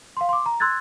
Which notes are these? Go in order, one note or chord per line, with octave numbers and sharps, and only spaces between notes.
F5 C6
C6 D6
A#5
C6 E6 F#6 G#6 A6